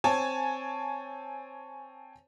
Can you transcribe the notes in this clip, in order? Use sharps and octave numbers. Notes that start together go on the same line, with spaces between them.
C4 C#5 G#5 A5